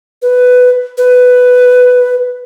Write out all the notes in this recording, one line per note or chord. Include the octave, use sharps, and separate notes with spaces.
B4
B4